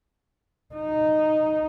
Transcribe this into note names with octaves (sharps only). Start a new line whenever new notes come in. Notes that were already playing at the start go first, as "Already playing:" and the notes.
D#4